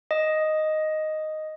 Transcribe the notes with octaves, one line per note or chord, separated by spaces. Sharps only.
D#5